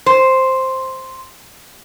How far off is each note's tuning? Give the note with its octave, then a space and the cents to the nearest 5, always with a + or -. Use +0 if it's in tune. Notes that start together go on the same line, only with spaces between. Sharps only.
C5 +0